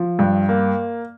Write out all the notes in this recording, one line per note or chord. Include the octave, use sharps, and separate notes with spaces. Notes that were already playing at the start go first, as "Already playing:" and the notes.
Already playing: F3
G2
A#3